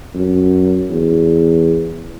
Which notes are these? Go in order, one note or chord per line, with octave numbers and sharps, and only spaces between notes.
F#2
E2